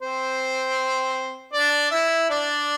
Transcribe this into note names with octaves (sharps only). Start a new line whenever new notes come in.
C4 C5
D4 D5
E4 E5
D4 D5